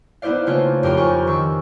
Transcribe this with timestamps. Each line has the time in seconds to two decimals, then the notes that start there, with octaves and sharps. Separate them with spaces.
0.22 B3 D#4 E4 C5 D5 F5
0.46 C#3 A3 A#3 F4 C5 C#5
0.83 F2 G4 A#4 G5 C6 D7
0.97 F4 G4 A#4 C5 G#5 C#6
1.27 D#3 C#6 E6